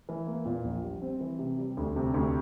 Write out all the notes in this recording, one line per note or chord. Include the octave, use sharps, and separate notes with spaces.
E3
A#3
A#2
A#1
G3
C4
E3
C3
G3
D2
C3
D2